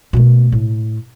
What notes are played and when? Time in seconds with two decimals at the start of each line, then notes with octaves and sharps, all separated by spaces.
0.13 B2 A3
0.52 A2